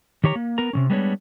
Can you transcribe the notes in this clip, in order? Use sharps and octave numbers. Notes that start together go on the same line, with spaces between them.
D#3 G4 C#5 A#5
A#3
B3 A#4 A#5
C3 D#3 C#4
G3 G#3 B3 D4 C5 C#5